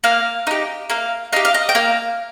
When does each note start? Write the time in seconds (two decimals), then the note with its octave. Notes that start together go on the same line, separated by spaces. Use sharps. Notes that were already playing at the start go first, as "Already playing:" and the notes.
0.04 A#3 F5
0.47 D#4 G4
0.90 A#3 F5
1.33 D#4 G4 F5
1.45 F5
1.54 D#5
1.69 G5
1.75 A#3 F5